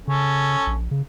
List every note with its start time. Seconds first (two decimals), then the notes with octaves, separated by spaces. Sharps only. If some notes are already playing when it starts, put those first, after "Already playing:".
0.07 C#3 C#4 A4
0.67 A#1
0.91 C#3